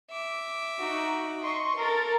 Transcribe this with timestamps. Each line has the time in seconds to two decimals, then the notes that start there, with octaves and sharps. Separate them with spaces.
0.10 E5 D6
0.81 D#4 F#4
1.42 D#5 C6 C#6
1.78 A4 A#4 A6